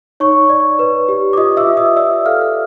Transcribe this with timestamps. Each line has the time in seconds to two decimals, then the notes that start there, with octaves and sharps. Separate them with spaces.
0.20 D#4 C#5 C#6
0.49 D5
0.79 B4
1.09 G4
1.33 D6
1.37 F4 D#5 D#6
1.57 E5 E6
1.67 F4
1.77 D#5 D#6
1.96 D5 E5 E6
2.26 A4 F5 F6